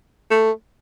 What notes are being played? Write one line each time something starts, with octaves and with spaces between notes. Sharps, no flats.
A3